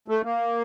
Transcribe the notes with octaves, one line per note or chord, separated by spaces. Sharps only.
A3
A#3